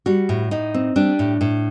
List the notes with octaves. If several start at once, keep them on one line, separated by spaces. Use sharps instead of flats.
G3 F#4
A2
A2 D#4
C4
G3 D4
A2
A2